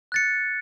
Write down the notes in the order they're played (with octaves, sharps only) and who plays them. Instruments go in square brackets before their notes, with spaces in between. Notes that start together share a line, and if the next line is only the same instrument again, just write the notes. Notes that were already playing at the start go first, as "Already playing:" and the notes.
[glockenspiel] F#6 A6 C#7